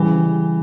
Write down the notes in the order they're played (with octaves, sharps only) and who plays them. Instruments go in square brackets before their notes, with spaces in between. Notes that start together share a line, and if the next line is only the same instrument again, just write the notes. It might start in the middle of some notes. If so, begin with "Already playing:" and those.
Already playing: [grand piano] C#3 E3 [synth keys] G3